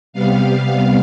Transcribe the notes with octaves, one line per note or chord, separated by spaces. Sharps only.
C3 G3 B3 F5